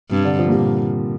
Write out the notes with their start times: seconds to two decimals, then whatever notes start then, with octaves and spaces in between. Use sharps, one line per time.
0.11 G2 C3
0.24 D3
0.39 F3
0.48 A#3
0.52 A#2 G3